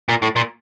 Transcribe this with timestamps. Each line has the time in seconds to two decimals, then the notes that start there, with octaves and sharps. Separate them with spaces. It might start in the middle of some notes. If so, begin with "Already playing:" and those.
0.09 A#2
0.22 A2
0.36 A#2